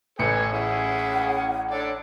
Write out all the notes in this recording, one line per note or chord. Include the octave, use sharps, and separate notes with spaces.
A1 A2 A4 B4 C#5 G#5 C#7
C#4 E4 G#4 F#5
D4 A4 C#5 D5